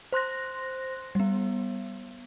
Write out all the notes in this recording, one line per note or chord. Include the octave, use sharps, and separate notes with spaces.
C5 C6 F#6 A#6
G3 B3